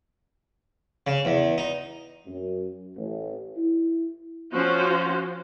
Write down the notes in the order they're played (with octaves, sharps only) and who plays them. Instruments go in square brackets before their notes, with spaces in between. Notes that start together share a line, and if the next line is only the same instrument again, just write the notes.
[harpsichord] C#3
E2
D#4
[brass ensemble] F#2
A1
E4
[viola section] F3 C#4 F#4 C5